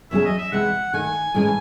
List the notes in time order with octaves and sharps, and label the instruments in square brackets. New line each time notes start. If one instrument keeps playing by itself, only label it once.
[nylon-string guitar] E2 C#3 F#3 C#4 G#4 [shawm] E5
[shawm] D#5
E5
[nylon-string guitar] C3 E3 G#3 [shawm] F#5
[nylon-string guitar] D#3 A3 D#4 [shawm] G#5
[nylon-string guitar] A2 E3 G#3 C#4 [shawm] G#5